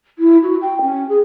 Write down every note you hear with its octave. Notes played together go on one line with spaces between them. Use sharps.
E4
F#4
G5
C#4
G#4